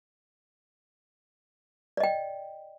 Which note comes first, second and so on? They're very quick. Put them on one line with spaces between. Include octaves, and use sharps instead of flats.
D5 D#5 G5